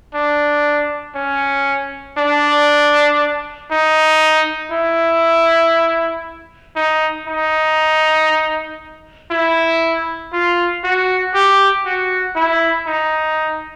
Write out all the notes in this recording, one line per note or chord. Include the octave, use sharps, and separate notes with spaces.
D4
C#4
D4
D#4
E4
D#4
D#4
E4
F4
F#4
G4
F#4
E4
D#4